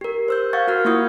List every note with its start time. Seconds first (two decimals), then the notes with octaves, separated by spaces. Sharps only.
0.01 G4 A#4
0.28 C5 E6 G6
0.53 F5 F#5 C#6 G#6 A6
0.68 F#4 A#4 F#5 F6
0.85 A#3 E4 F4 C#6 D#6 G6